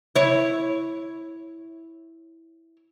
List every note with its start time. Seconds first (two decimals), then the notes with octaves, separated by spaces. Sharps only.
0.16 E4 C#5